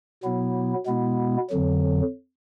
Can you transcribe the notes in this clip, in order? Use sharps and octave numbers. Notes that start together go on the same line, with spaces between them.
B2 F#3 B3 E4
B2 G#3 B3 E4
F2 D3 F#3